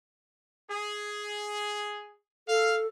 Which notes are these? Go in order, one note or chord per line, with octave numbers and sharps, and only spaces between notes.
G#4
A4 F5